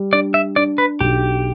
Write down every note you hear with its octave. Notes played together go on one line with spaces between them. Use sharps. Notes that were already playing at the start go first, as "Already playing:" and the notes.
Already playing: G3
D4 D5
E5
D4 D5
B4
B1 G4